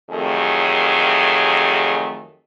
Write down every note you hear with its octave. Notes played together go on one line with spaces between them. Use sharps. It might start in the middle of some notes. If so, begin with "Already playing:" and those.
F2 D#3 F#3 A3 G4 G#4